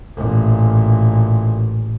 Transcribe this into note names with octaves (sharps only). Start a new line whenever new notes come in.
A1 A#2